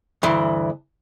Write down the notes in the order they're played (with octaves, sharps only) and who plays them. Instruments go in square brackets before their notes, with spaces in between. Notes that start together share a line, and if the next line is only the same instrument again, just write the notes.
[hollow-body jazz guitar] D2 G2 E3